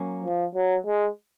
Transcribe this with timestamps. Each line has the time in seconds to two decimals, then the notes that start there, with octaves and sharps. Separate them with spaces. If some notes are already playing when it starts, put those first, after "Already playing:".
Already playing: F#3 A#3 C#4
0.24 F3
0.55 F#3
0.86 G#3